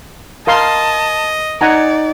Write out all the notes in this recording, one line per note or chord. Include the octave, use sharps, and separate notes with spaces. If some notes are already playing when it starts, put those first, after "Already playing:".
A#4 D#5 F5 A5 C6
D#4 D5 F#5 G#5 A#5